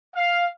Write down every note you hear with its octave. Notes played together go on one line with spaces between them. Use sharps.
F5